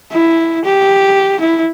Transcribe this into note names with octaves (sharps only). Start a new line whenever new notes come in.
E4
G4
E4